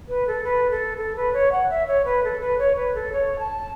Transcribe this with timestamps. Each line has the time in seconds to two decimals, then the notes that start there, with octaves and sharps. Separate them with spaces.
0.09 B4
0.27 A4
0.44 B4
0.71 A4
0.98 A4
1.16 B4
1.33 C#5
1.52 F#5
1.70 E5
1.87 C#5
2.05 B4
2.24 A4
2.41 B4
2.59 C#5
2.76 B4
2.94 A4
3.13 C#5
3.39 A5